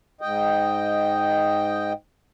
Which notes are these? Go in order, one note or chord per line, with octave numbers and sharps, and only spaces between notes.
G#2 D#5 G5